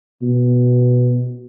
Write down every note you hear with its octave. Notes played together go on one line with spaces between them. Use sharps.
B2